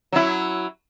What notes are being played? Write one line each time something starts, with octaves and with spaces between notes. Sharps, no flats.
F#3 E4